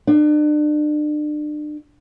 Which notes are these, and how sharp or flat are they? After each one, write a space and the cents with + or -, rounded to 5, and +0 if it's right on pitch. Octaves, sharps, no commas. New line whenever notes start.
D4 +35